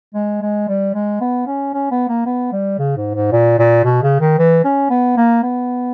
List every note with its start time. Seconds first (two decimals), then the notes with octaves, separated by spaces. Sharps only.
0.15 G#3
0.41 G#3
0.68 G3
0.94 G#3
1.21 B3
1.47 C#4
1.74 C#4
1.91 B3
2.08 A#3
2.26 B3
2.53 G3
2.79 C#3
2.97 G#2
3.14 G#2
3.32 A#2
3.59 A#2
3.84 B2
4.03 C#3
4.20 D#3
4.38 E3
4.65 C#4
4.90 B3
5.17 A#3
5.43 B3